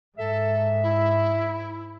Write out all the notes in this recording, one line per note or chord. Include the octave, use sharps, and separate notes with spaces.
G#2 A4 E5
E4